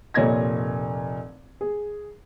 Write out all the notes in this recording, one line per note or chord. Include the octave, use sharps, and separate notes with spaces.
F1 A#2 C#5 D#5 G#6 A#6
G#4